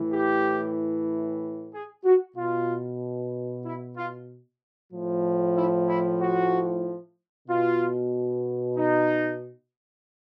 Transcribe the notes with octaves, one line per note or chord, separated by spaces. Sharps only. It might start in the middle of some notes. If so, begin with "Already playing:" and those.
Already playing: A2 E3
G4
G#4
F#4
B2 F4
E4
F4
A2 F3
E4
E4
F#4
B2 F4
D#4